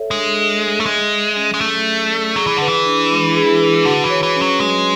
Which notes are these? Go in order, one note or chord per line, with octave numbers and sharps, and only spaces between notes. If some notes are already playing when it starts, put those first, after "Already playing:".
Already playing: A4 C#5 E5
G#3 D4
C#5
E5
A3
G#3 G#4
D5
C#4
G#3
F#3 A3
G#4
D5
F#3 G#4
E3
D3 B4
E3
D4
G#3
G#4
B4
D3 F#4
E3
C#5
E3
C#4
F#3
F#3 G#3